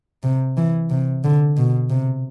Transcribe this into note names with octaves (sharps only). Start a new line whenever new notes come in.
C3
E3
C3
D3
B2
C3